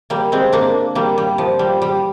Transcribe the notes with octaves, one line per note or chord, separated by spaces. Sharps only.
G3 A#3
G#3 C4
A#3 D4
G3 A#3
G3
F3
G3
G3